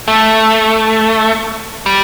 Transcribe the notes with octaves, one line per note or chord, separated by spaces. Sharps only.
A3
G3